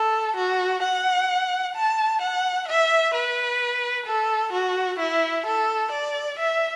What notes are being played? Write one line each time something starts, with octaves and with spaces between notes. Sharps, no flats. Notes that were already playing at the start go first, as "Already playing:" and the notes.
Already playing: A4
F#4
F#5
A5
F#5
E5
B4
A4
F#4
E4
A4
D5
E5